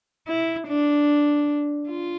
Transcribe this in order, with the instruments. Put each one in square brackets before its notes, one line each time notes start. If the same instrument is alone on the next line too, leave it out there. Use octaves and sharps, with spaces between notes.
[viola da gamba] E4
D4
F4